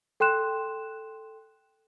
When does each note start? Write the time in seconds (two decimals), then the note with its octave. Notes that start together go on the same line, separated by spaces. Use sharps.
0.20 A4 G5 C6 F#6 E7